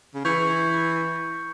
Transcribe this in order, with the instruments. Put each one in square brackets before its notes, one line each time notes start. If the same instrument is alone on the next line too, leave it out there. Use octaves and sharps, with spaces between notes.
[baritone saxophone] C#3
[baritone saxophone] E3 [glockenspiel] C#6 G6 C#7